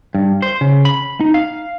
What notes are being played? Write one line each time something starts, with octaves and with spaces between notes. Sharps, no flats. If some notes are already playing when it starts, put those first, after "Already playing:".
G2
C5
C#3
B5
D#4
F5